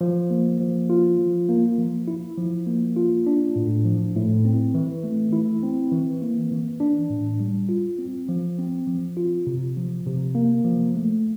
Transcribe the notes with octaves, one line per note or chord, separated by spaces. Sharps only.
F3
A#3
F3
F4
F3
A#3
F3
E4
F3
A#3
F4
D4
A2
F3
A2
C4
E3
A3
E4
C4
E3
A#3
E3
D4
A2
G3
F4
C4
F3
C4
F3
F4
C3
F3
C3
A#3
F3
A3